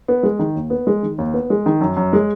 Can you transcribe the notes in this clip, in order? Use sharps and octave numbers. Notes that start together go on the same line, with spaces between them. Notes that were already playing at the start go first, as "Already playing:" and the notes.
B3
G#3
D#3
D#2
B3
G#3
D#3
D#2
B3
G#3
D#3
F#2
F#2
G#3